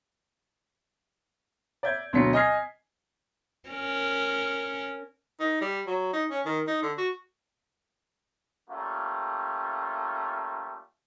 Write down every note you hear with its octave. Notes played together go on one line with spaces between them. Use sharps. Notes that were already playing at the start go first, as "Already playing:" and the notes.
D5 E5 G6 G#6
D2 B2 F#3 D5 B6 C#7
D#5 G#5 D#6 F6 G#6 C7
C#4 A#4
D#4
G3
F#3
D#4
C#4
D#3
D#4
D3
F#4
G3 A3 A#3 C#4 F4